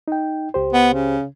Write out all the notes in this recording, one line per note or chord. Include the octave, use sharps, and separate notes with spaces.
D#4 G5
C#2 G4 C5
B3
C#3